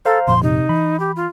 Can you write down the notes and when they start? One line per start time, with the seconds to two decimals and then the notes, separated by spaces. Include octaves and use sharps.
0.05 A4 C5 F5 A#5
0.27 F1 A#2 F3 C6
0.43 C3 D#4
0.69 E3 B5
1.00 G4
1.16 F4